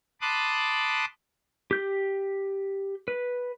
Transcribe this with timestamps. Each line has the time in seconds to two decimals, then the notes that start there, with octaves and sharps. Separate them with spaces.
0.21 A5 B5 C6 D6 D#6 F#6
1.71 G4 G6
3.08 B4